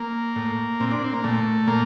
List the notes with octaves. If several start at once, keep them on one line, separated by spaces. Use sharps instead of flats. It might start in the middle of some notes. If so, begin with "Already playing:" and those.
Already playing: A#3
A2
A#2 C4
D4
C4
A#3
A#2 A3
A#2 A#3